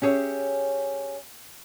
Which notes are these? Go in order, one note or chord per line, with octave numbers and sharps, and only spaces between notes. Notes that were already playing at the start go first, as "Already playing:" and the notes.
C#4 G4 G#4 C#5 E5